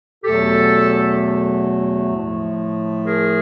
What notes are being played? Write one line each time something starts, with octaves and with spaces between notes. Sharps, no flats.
E2 B2 F#3 A3 G4 A4
A2 F3 A3
G#4 A#4